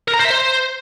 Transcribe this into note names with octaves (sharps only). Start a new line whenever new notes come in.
A#4
A#5
C5
E5
C5